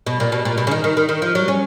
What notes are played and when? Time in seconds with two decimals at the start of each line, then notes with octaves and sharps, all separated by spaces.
0.06 B2
0.20 A#2
0.32 B2
0.45 A#2
0.58 B2
0.67 C#3
0.71 D#3
0.84 D#3
0.97 D#3
1.09 D#3
1.22 F3
1.35 F#3
1.48 C#4